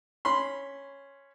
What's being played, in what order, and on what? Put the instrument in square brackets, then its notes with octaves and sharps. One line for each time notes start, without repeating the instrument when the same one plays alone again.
[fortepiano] C#4 B5 C6